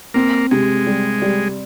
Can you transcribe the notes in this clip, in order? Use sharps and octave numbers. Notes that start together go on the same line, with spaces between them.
A#3 C4
C3 G#3
G3
G3